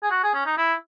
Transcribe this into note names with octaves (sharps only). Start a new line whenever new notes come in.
G#4
F#4
G#4
C#4
D#4
E4